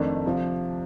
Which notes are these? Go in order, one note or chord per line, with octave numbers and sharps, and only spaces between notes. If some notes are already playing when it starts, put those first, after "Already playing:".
Already playing: F2 D#3 A3 D4
C3 F3